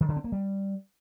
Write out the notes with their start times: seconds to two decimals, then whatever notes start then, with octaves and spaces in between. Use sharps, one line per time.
0.01 D#3
0.09 D3
0.16 C4
0.24 A#3
0.32 G3